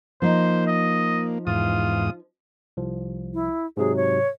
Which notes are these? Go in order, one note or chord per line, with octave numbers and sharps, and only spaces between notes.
F3 A#3 D#4 C5
D#5
E2 G#2 F4 D#6
C2 F3
E4
G#2 C3 F#3 G#4
C#5